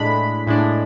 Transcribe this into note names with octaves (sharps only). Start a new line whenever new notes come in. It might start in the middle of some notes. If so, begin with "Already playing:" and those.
Already playing: A2 G#3 D4 B5
A2 G#3 D4